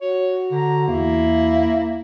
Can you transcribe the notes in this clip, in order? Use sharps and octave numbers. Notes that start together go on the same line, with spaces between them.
F#4 C#5
D3 A#5
E2 A#3 E4